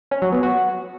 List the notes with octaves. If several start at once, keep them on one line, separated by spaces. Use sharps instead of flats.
C#4
F#3
B3
F#4